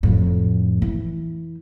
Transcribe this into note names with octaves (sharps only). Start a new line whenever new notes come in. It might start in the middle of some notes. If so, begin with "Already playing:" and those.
F2 A2
E3